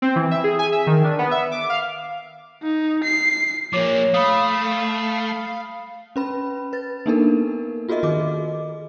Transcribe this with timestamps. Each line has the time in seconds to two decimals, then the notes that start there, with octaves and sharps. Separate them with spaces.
0.02 C4
0.16 E3
0.31 E5
0.44 G#4
0.59 G#5
0.72 E5
0.87 D#3
1.04 D4
1.19 B3
1.31 E5
1.52 D6
1.70 F5
2.63 D#4
3.04 C7
3.73 F3 A#3 C#5 D6
4.14 A3 F5 B5 D#6
6.16 C#4 B4 B5
6.73 B4 A6
7.06 A#3 B3 D4 D#4 A4 A#4
7.89 F4 F#4 G#4 A#4 D#5 E5
8.03 D#3 G#4 D#5 D6